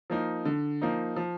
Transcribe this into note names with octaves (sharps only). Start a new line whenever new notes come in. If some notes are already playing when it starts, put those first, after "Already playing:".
F3 A#3 D#4
D3
F3 A#3 D#4
F3